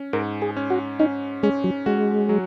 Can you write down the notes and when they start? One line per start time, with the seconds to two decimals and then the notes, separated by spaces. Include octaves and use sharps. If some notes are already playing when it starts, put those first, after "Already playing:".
Already playing: C#4
0.13 G#2 A#4
0.42 G#4
0.57 C#4
0.70 F#4
1.00 C#4 D#4
1.43 G#3 C#4
1.64 F#3
1.86 G#3 F#4
2.29 F#3